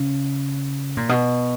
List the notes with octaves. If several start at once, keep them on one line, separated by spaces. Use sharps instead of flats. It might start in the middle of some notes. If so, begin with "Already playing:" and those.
Already playing: C#3
A#2
B2